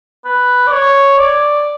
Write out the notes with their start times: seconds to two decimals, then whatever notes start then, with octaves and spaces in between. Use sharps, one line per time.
0.25 B4
0.67 D5
0.72 C#5
1.18 D5